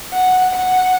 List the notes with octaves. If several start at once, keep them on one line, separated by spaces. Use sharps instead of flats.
F#5
F#5